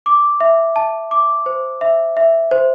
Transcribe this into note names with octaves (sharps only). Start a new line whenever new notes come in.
D6
E5
A5
D6
C5
E5
E5
C5